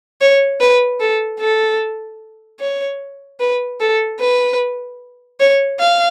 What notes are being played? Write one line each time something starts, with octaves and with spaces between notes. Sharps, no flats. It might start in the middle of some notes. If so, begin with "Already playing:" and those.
C#5
B4
A4
A4
C#5
B4
A4
B4
C#5
F5